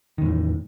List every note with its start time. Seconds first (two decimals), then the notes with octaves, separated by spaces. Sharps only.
0.18 D#3
0.22 E2
0.25 A2